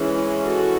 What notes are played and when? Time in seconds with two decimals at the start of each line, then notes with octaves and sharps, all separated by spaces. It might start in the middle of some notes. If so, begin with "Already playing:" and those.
Already playing: E3 G#3 C#4
0.44 F#4 A4